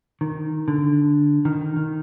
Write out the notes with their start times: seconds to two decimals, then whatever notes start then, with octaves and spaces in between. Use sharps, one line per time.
0.21 D#3
0.68 D3
1.45 D#3
1.76 D#3